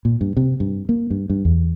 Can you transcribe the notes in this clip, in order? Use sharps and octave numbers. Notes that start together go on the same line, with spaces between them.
A#2
G2
C3
G2
A#3
G2
G2
E2